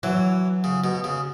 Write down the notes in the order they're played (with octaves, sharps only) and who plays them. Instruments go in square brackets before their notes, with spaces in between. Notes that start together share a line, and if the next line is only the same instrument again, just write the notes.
[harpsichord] E3 [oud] F#3
[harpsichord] C#3
B2
C#3